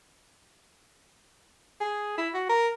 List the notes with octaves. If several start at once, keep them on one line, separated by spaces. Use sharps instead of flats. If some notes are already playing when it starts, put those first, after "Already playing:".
G#4
E4
F#4
A#4